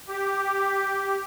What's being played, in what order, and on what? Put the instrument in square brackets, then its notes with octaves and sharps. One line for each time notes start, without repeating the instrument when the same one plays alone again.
[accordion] G4